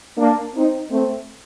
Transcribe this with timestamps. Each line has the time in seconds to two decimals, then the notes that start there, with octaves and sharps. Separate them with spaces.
0.17 A#3 D4
0.54 C4 D#4
0.90 A3 C4